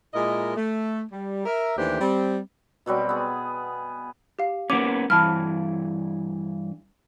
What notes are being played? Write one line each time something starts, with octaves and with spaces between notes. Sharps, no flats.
A#2 G#3 E4 A#4 D#5
A3
G3
A#4 E5
D#2 E3 A3 D4 G4 C5
G3 C4
B2 F#3 G3 C4
B3 G#4
G4 F5
A#3 B3 C#4 D6
G2 E3 A5 B5 F6